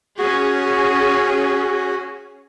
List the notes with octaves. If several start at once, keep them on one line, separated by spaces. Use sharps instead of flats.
C#4 F#4 G#4